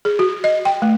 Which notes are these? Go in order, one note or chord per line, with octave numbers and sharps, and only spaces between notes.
G#4
F#4
D#5
G5
A3